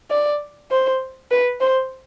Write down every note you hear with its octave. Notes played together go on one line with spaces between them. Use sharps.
D5
C5
B4
C5